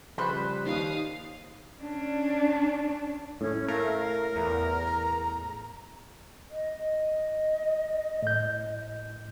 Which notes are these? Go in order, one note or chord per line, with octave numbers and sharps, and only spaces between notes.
C#3 F3 G3 B4 C5 B5
D#2 F5 D#6
C#4 D4
A2 C#4
A3 A#4 F5
E2 A#5
D#5
A2 G6